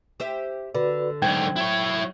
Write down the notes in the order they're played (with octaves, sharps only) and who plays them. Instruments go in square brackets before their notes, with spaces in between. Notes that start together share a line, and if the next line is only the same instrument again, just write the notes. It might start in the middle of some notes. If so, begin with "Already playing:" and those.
[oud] G4 C5 E5
[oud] D3 [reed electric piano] F#4 B4 D5
[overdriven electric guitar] G#2 D3 [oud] F#3 C5 [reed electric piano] G5 G#6
[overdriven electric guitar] E4 C#5